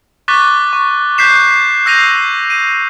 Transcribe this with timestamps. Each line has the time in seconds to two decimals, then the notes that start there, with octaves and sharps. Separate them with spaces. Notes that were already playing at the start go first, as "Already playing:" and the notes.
0.28 C#6 D6 F#6 A6 B6 G7
0.73 C#6
1.18 F#6 G6 B6 C7 E7
1.86 E6 G6 A#6 C7 D#7 F7
2.50 D#7